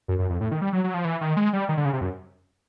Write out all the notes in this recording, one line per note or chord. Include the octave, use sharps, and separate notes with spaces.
F#2
F#2
F2
A2
D#3
G3
F#3
F#3
F3
E3
D#3
G#3
G3
D#3
D3
C#3
C3
F#2